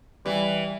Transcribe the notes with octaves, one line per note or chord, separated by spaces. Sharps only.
E3 G3